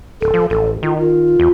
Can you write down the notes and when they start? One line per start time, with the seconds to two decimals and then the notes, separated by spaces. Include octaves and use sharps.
0.21 D1 A4
0.34 F3
0.50 A1 A4
0.83 D#3 F4
1.00 F4
1.40 E2